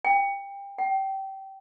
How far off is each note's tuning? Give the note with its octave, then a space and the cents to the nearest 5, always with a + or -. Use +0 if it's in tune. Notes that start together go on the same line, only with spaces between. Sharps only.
G5 +25
G5 -25